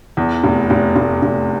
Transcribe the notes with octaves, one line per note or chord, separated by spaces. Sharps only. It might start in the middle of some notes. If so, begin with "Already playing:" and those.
E2
F1
F1
F1
F1